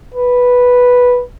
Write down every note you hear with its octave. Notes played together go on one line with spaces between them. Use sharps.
B4